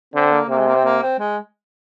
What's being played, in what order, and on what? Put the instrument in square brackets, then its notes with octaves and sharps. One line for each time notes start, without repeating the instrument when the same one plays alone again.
[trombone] D3 [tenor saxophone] C4
[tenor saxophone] A#3
[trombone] C3 [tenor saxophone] A#3
[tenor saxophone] G#3
A#3
C4
A#3
C4
G#3